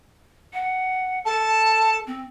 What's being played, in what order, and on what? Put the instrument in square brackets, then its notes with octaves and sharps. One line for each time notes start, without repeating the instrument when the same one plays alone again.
[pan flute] F#5
[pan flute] A4 [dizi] A5
[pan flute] C4